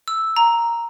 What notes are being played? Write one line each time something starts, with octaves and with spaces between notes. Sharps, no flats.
E6
A#5